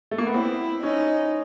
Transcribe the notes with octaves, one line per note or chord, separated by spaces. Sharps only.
A3
A#3
B3
C4 E4
C#4 D#4